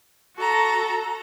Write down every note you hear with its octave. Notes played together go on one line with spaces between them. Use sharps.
F#4 A4 A#5